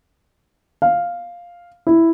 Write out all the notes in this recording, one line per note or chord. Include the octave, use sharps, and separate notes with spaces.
F5
E4